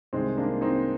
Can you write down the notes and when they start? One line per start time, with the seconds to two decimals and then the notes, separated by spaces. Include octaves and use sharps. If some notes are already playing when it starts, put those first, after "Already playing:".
0.13 C2 C3 D#3 G#3 C4
0.37 A#3 D4
0.61 C4 D#4